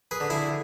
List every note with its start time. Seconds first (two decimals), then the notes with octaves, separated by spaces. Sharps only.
0.11 G#4 B4
0.21 D3
0.30 E4 G#4